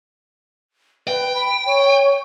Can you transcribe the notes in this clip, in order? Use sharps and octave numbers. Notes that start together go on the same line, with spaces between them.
B4 G5
B5
C#5